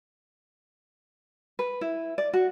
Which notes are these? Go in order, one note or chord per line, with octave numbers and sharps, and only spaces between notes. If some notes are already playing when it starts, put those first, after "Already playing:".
B4
E4
D5
F#4